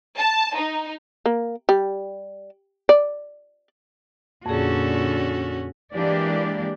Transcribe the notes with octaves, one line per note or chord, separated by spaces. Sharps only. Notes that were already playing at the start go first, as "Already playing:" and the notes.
A5
D#4
A#3
G3
D5
F2 A#2 D3 C#4 F#4 G#4 A4
E3 G#3 A#3 D4 G4 D5